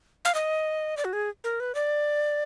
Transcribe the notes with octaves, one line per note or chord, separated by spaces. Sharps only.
F5
D#5
D5
F#4
G#4
A#4
B4
D5